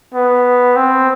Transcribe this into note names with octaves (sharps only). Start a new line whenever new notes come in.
B3
C4